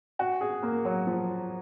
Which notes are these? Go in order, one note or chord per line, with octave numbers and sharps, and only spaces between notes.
F#4
G#4
A#3
F#3
F3